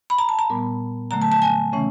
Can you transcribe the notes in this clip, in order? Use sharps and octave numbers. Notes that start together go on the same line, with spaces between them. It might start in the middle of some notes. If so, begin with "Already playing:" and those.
B5
A#5
A5
A#5
A#2 G3 B3
D3 F#3 A3 A#5
A5
A5
G#5
C#3 E3 A3 C#4